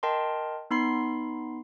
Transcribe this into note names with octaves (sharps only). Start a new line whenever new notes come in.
A#4 D#5 G5 A5 C6
B3 D#4 B5 C6 C7